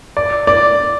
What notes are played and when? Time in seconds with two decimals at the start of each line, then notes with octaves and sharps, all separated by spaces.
0.17 D5
0.47 D5